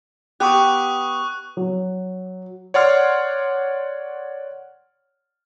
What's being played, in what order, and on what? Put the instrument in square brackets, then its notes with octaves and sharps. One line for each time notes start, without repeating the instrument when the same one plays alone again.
[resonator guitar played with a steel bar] B3 G4 [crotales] C#6 D#6 F#6
[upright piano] F#3
[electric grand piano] C#5 D5 F#5 C6 F6